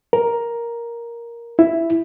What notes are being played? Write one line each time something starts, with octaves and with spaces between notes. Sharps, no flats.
A#4
E4